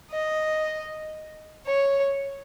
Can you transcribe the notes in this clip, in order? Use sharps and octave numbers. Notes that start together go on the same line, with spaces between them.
D#5
C#5